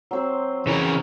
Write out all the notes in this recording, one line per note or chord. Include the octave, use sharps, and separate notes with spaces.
F#3 C4 C5
C#3 E3 A#4